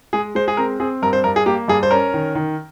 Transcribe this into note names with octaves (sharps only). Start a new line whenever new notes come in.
G#3 G#4
G#3 C5
G#4
C4 A#4
C4 G#4
G2 A#4
C5
G2 A#4
G#4
A#3 G4
G2 G#4
C5
C#4 A#4
D#3
D#3